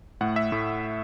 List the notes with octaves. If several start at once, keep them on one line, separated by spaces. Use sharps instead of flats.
A2 A3 F#5
E5
A2 A3